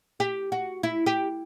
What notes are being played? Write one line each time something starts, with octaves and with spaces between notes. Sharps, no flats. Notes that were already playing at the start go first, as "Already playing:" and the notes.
G4
F#4
E4
G4